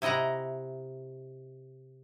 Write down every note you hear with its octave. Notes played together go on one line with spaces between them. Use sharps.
C3 E4 D#5 F#5 A#5